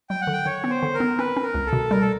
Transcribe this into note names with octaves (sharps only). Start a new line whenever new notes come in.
F#3 G5
F#5
D3
G5
D3 C#5
B3
C5
D3
A#4
B3
C4 B4
C4
A#4
C#2
A4
B2
G3 A#4
A4